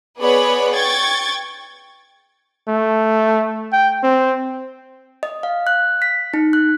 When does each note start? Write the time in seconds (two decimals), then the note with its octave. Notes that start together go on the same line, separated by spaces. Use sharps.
0.19 B3 G#4 B4 C#5 D5 B5
0.74 G5 C#6 G#6 A6
2.68 A3
3.73 G5
4.03 C4
5.23 D#5
5.43 F5
5.67 F#6
6.02 B6
6.34 D#4
6.53 F#6